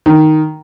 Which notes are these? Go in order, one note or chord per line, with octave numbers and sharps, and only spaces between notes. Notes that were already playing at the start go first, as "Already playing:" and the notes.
D#3